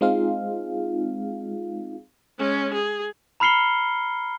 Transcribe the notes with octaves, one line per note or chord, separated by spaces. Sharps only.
G#3 C4 D#4 F4 G#4 F5
G#3 C#4
G#4
A#5 B5 F6 C7 C#7 G7